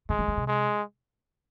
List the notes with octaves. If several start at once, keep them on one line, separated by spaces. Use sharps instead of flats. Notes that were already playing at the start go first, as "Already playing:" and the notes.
D3 G#3
F3
E3
C3
G#3